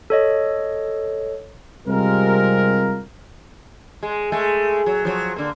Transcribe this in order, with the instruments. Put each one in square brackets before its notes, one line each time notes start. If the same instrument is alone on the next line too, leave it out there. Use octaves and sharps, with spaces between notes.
[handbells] A4 C#5 D#5
[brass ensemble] C3 G3 G#3 C4 F4 A#4
[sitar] G#3
G#3 A3
F#3
F3 F#3
D3 A#3